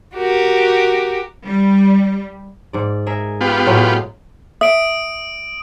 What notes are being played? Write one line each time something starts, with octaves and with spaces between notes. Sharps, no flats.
F#4 G4 A#4
G3
G#2 D5
G#4 A#4 E5
B3 F4 G4
A2 F#3 G#3
E5 D#6 D7